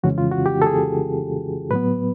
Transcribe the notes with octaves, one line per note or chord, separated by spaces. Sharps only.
F2 C#3 E3 G#3 C#4 F#4
F4
F#4
G4
A4
G#4
A2 F#3 B3 B4